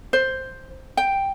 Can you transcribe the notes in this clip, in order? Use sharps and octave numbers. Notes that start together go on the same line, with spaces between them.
C5
G5